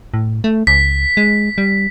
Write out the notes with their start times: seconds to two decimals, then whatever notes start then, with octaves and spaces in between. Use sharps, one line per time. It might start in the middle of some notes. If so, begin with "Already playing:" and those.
0.14 A2
0.44 A3
0.67 C#2 B6
1.17 G#3
1.58 G3